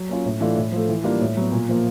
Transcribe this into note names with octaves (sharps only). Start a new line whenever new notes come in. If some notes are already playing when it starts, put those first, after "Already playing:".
Already playing: F#3
A#3 C#4 F4
A2
E3 A3 D4 F4
A2
F3 A3
E3
G3 A#3 D4 F4
A2
F#3 B3
A#2
F3 A#3